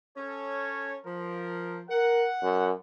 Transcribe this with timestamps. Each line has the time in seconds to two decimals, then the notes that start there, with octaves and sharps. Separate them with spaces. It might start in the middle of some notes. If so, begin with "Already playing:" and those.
0.17 C#4 A4 C#5
1.05 F3 A#4
1.90 A#4 F#5
2.43 F#2